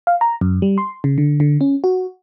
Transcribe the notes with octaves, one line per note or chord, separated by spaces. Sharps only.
F5
A#5
F#2
G3
C6
C#3
D3
D3
C#4
F#4